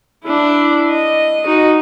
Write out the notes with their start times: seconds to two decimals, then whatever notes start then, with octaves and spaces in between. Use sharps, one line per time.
0.25 D4 E4
0.90 D#5
1.46 D#4 F#4